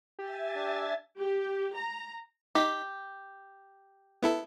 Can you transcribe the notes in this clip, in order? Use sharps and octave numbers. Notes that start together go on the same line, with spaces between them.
G4 E5 G#5 A6
D4
G4
A#5
D#4 G4 B6
B3 E4 A4